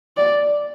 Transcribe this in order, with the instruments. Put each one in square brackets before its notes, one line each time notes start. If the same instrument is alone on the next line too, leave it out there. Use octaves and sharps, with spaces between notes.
[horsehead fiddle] D5